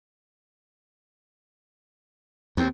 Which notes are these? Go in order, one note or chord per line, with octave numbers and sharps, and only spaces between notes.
D#2 C4